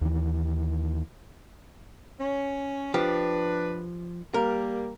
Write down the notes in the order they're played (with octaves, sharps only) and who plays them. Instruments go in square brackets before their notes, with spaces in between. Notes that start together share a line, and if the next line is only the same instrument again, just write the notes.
[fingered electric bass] D#2 E3
[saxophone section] C#4
[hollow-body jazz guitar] F3 G4 [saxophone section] D4 B4
[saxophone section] G3 A#3 [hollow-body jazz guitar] A#4